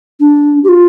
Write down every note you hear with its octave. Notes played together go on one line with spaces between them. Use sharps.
D4
G4
F4